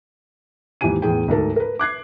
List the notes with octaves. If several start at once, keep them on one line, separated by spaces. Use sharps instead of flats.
D#2 G#2 E3 G4 G#5 D#7
E2 A2 G#4 G5
D2 G#2 A4 A#4
A#4 B4
D6 F#6 G#6 C7